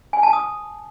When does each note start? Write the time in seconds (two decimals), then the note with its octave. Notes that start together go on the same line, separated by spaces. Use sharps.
0.13 G#5
0.23 A5
0.33 D#6